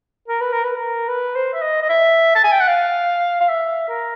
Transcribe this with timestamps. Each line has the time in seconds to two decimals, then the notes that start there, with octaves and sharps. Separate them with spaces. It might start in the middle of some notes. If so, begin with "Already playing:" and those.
0.28 A#4
0.41 B4
0.52 A#4
0.64 B4
0.76 A#4
1.08 B4
1.36 C5
1.53 E5
1.62 D#5
1.82 D#5
1.89 E5
2.35 A5
2.44 G#5
2.52 G5
2.60 F#5
2.68 F5
3.40 F5
3.49 E5
3.89 A#4